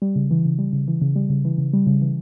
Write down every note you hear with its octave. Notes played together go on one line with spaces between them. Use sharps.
G3
C#3
E3
C#3
G3
C#3
E3
C#3
G3
C#3
E3
C#3
G3
C#3
E3